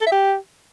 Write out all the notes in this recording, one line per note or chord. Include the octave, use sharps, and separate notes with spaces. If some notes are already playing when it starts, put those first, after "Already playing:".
A4
E5
G4